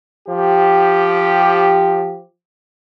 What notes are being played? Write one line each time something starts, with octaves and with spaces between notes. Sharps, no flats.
F3 G4